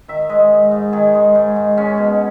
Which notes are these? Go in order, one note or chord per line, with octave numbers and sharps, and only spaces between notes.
D#3 E5
G#3 D#5
G#2
G#2
D#3 G#4
G#3
G#2
G#2
G#3 C#4
B2